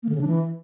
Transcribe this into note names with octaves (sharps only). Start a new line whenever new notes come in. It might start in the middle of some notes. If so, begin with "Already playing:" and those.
A#3
D3
C#3
D4
E3